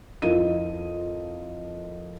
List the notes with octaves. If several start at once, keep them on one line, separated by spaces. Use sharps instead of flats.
F2 E4 F4 A#4 D#5 D#7